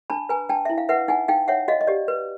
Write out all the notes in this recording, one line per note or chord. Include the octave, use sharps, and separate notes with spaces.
D4 A5 B5
B4 G#5 A#5
D4 G5 A5
E4 E5
F5
B4 E5 F#5
D#4 F#5 G#5
D#4 F5 G5
C#5 E5 F#5
F#4 D#5 F5
D#5
G4 D5
B4